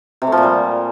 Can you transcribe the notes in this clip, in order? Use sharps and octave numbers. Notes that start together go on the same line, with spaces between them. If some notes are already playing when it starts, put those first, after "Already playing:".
C3
A3
F3
A#2
G3